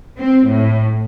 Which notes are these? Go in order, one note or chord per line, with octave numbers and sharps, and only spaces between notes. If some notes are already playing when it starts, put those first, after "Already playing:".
C4
A2